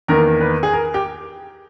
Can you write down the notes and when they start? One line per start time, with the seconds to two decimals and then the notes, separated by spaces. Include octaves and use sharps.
0.08 E2 D#3 A#3 A#4
0.41 B4
0.63 G#4
0.73 A#4
0.94 G4